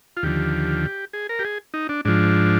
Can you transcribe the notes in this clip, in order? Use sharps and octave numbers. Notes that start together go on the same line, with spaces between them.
F4
D#2 D3 F3 G4
G#4
A#4
G4
G#4
D#4
D4
G#2 F3 D4